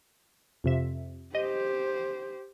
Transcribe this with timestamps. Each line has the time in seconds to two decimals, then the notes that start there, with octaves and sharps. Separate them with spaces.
0.64 F2 C3 E5
1.35 G4 C5 D#5